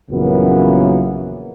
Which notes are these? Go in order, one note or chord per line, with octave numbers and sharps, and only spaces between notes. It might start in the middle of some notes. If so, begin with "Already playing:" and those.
A#1 F#2 C#3 E3 A#3 B3